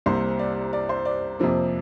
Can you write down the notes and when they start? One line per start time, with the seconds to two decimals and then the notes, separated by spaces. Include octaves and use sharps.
0.06 C2 C3 G3 A#3 C5
0.39 D5
0.73 D5
0.89 C5
1.05 D5
1.40 F2 C3 F3 A#3